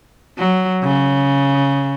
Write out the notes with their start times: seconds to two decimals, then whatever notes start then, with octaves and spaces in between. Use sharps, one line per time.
0.38 F#3
0.83 C#3